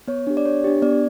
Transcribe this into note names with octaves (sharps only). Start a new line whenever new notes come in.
B3 C#5
D4 G4
D5
B3 C#5
D4 G4
B3 D5